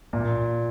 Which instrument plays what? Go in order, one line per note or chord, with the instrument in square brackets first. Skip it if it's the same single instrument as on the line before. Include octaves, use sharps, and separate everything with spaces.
[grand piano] A#2